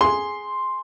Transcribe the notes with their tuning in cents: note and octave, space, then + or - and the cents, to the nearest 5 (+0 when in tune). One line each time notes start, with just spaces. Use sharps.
G#4 +0 C6 +0